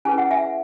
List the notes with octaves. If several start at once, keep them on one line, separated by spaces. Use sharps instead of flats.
C#4 E4 G#4 B4 G#5
F#5
E5 G#5